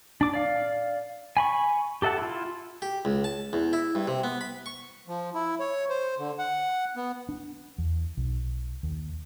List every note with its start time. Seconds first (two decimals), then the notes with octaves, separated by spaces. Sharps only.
0.21 D4 D6
0.34 D5 F5
1.37 G#5 B5 C#6
2.02 G4 A4 E5 F#5 A5
2.18 E4 F4
2.82 G4
3.05 C#2
3.24 A5
3.53 E2
3.73 E4
3.95 G2
4.08 C3
4.24 B3
4.41 B5
4.66 C#6
5.07 F3
5.35 E4
5.60 C#5
5.90 C5
6.18 D3
6.39 F#5
6.96 B3
7.29 D4
7.78 E2
8.17 B1
8.83 D#2